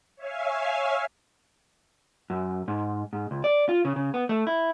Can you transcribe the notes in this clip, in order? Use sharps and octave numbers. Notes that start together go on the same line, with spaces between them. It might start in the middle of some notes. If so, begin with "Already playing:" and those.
C#5 E5 F5 G#5
F#2
G#2
G#2
C#2
D5
F4
C#3
C#3
B3
A3
E4